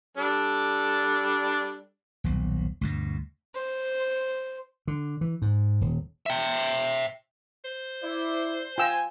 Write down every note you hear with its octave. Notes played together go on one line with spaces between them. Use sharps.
G3 D4 A4
D#1 B1
D2 G2 B2
C5
D3
E3
G#2
D#1
E5 G5
C5
E4 D5
F4 G5 G#5 E6